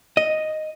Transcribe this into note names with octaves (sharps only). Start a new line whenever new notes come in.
D#5